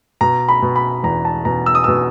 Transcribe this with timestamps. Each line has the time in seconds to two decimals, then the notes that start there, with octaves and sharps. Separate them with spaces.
0.21 B2 A#5
0.49 B5
0.62 B2
0.76 B5
1.03 E2 A#5
1.25 A5
1.45 B2 A#5
1.66 E6
1.75 D#6
1.84 B2 E6